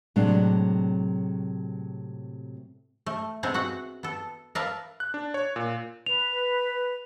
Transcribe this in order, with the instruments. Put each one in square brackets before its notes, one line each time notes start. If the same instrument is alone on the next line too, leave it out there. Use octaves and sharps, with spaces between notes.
[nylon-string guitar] A2 C3 F#3 G#3 D4
[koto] A3
G#3 B3 C4 E4 G#4
F#4 F#5
B3 A4
A#4 B4 E5 F5 A5
[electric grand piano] F#6
D4
C#5
A#2
[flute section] B4 [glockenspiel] F7